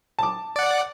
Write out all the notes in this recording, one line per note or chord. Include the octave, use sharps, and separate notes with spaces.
A5 D6
D5 F#5